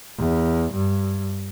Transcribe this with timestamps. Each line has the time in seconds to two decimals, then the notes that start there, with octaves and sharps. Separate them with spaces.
0.18 E2
0.73 G2